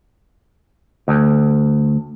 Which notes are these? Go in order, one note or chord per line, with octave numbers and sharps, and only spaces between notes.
D2